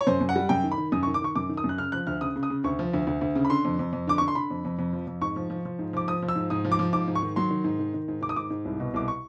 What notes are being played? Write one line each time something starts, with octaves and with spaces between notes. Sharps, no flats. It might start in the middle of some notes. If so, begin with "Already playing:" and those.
C#5
F#2 C5
F#2
F#5
G3
F#2 G5
D#3
B5
D#3
F#2 D#6
C#6
D#3
D6
D#3 C#6
F#2 D6
D#3
D#6
F#2
F#6
C#3 F6
F3 F#6
D2 F6
C#3 D#6
C#3
D#6
C#3
D2 C#6
F3
D2
D2
D2
C#3
B5
D3 C6
F2
F2
F2
D3 D6
D3 C#6
C6
D3 B5
F2
F2
F2
F3
F2
G#2 C#6
F3
F3
F3
G#2
F3 D6
F3 D#6
F3
E6
G#2
G#2 D#6
F3
D6
F3
G#2 D6
G#2
C#6
D#3
F#3 C6
D#3
G#2
D#3
D#3
G#2
D#3 D6
D#6
G#2 D6
G#2
C2
B2
C2 D6
C#6